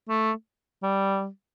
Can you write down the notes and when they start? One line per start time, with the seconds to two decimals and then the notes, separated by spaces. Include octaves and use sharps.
0.09 A3
0.83 G3